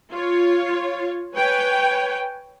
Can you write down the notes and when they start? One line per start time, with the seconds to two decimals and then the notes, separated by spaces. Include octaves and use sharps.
0.11 F4 C#5
1.35 B4 C#5 G5 G#5